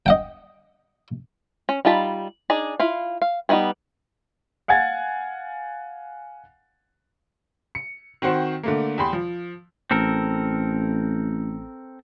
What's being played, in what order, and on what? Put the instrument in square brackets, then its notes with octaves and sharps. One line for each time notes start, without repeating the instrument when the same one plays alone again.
[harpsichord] D#5 F#5 G5
[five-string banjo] C#4
G3 D#4 F4 A5 B5
D4 D#4 G#4 D5
E4 F4 F5
F5
G3 B3 D#4 E4 G#4
[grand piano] F5 F#5 G#5 G#6 A6
[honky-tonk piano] C#7
D#3 C4 F#4 C5
D3 A3 A#3
E2 G4 B5 C6
F3
[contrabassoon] A1 [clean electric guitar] C4 A4 A#4